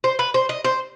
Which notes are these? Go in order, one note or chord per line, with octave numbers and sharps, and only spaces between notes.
C5
B4
C5
D#5
C5